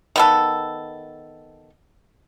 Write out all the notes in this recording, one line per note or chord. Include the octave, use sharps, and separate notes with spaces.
D#3 B3 A4